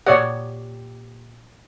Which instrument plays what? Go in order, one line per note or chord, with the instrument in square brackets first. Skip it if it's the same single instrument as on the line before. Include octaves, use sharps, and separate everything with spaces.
[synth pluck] A#2 G4 [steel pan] C#5 D5 F#5